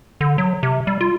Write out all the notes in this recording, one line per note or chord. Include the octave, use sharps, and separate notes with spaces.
D3
F#3
C3
G3
F4